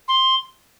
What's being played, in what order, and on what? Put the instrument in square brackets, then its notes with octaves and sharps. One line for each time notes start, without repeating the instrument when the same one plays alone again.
[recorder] C6